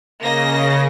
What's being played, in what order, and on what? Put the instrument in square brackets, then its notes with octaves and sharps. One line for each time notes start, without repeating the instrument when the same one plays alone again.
[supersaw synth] C#3 [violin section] A#3 D#5 A#6